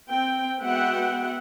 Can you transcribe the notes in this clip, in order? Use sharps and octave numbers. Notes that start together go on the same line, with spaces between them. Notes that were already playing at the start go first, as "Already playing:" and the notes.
C4 G5
G#3 B3 F#4 E5 F#5 G5